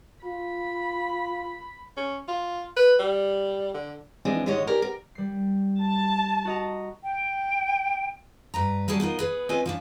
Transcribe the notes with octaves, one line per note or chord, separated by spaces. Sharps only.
F4 B5
C#4
F4
B4
G3
D3
E3 F3 G#3 C4 D4 D#4
D#2 G#2 D3 G#3 C#5 D#5
G4 G#4 A#4 D5
A#4 G5
G3 C7
A5
F#4 D#5 A#5
G5
G2 B4 A#5
F#3 G3 C#4 G#4 A4 D5
B3 D#4 F4 A#4
B3 G#4 B4
C4 C#4 F4 B4 D#5 G#5
F3 C#4 D4